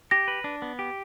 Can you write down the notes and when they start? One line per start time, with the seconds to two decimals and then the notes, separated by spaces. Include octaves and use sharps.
0.11 G4 A#6
0.28 B4
0.44 D4
0.62 B3
0.79 G4